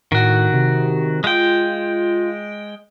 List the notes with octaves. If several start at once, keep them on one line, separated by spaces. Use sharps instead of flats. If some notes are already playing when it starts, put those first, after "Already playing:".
A2 D#3 F#4
C3
G#3 F4 G5